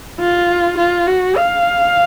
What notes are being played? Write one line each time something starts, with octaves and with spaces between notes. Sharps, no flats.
F4
F4
F#4
F5